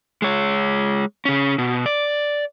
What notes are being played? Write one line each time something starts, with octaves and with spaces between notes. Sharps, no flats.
G#3 C#5
C#3 C#4
B2
D5